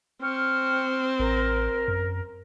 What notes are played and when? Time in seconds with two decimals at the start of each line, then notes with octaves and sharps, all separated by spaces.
0.22 C4 G5 C#6 F6
1.20 A1 A#4
1.88 F#2